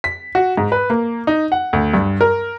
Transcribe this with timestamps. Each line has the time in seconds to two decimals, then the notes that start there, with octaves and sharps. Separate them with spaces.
0.04 B6
0.35 F#4
0.57 G#2
0.72 B4
0.90 A#3
1.27 D#4
1.52 F#5
1.73 D2
1.94 G2
2.21 A#4